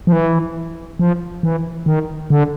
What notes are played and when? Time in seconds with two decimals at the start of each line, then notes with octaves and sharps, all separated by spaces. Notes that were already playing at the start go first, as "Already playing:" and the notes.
0.07 F3
0.12 E3
0.99 F3
1.43 E3
1.86 D#3
2.30 D3